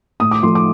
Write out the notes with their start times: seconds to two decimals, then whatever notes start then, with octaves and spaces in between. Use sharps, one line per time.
0.20 A2 D#6
0.31 D6
0.43 F3 A3 C6
0.55 D6